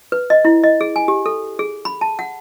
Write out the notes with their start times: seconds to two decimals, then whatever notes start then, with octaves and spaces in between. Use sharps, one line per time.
0.12 B4
0.30 D#5
0.45 E4
0.64 D#5
0.81 G#4
0.96 G#5
1.08 G4
1.26 A4
1.59 G#4
1.85 B5
2.01 A5
2.19 F#5